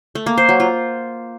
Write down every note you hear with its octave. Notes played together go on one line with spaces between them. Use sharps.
A3
A#3
C5
F#3
F4